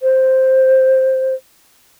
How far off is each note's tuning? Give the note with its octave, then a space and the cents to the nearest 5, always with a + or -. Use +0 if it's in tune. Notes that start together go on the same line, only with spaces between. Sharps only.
C5 +5